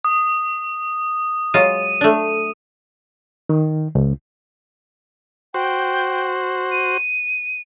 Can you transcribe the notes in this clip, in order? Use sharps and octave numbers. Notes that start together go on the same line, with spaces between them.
D#6
F#3 G#3 F4 D#7
A3 D4
D#3
C#2
F#4 C5 G5
D#7